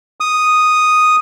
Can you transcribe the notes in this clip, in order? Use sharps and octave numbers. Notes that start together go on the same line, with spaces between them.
D#6